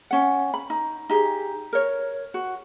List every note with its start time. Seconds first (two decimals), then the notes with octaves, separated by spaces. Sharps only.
0.11 C#4 F#5
0.54 B5
0.70 D#4
1.09 D#4 G4 G#4
1.73 A#4 C#5
2.34 F#4